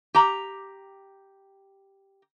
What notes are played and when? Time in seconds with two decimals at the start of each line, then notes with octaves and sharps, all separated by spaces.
0.14 G4 A#5